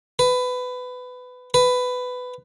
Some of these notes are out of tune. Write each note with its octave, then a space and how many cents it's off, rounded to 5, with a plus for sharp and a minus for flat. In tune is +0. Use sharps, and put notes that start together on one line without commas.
B4 +20
B4 +15